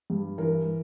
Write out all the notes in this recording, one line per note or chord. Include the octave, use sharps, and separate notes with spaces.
G2
E3 A#4